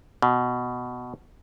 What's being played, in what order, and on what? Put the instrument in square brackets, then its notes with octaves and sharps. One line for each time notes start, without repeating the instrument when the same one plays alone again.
[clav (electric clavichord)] B2